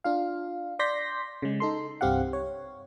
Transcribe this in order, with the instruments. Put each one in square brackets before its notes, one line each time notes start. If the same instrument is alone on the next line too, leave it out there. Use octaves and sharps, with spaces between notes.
[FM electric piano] D4 F4 F5
D5 C6 G6 A#6 B6
C#3 G#3
D#4 A4 C6
C2 G2 C4 G4 F5 F#5
C#5